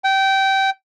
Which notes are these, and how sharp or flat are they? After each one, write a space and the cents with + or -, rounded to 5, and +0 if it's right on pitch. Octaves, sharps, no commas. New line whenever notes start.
G5 -20